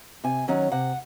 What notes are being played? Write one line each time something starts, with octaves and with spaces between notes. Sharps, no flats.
C3 G#5
D#3 F#3 C#4 F#5
C3 F#5